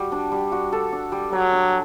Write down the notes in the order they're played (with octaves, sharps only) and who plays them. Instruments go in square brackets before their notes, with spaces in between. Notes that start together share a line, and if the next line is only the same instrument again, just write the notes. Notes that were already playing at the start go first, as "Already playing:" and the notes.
Already playing: [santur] G3 F#4
D4
G3
F#4
A4
D4
G3
[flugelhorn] F#3 [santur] D5
[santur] D4